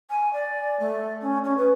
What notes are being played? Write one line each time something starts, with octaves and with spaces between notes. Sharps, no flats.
G#5
D5
A3
C#4
C#4
B4